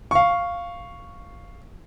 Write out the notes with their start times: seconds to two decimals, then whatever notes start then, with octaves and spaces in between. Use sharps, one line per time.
0.11 F5 C#6